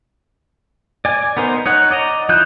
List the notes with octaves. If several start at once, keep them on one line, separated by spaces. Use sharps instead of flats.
D5 G#5
B3 D#4 A#4 C5
D#4 C#5 F#5
D5 D#5 A#5
F3 D#4 E4 F#6 G6